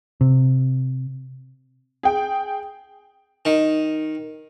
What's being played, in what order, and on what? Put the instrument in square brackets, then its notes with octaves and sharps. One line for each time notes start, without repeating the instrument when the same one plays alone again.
[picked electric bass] C3
[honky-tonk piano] G#4 G5
[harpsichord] D#3